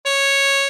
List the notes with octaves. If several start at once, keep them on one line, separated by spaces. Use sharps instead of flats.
C#5